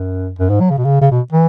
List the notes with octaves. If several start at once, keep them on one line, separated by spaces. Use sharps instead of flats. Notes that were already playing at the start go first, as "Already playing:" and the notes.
Already playing: F#2
F#2
G#2
F#3
C#3
B2
C#3
C#3
B2
E3